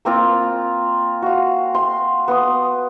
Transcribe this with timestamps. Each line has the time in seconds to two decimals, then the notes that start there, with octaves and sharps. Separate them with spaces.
0.05 A#3 C4 F4
1.22 F#4 F5
1.74 C6
2.28 B3 C6 D#6